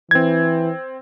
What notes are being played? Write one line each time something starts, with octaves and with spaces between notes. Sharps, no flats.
E3 C4 G#6